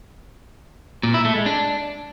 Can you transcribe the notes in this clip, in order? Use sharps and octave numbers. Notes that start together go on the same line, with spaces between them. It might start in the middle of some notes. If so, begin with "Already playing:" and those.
A#2
E4
A3
G#3
D4